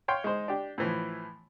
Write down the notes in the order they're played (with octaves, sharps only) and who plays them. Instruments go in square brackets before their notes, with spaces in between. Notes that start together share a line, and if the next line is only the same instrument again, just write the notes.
[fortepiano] C#5 F5 G5 C6
G#3 D#4 C5
D4 G4
A2 E3 F3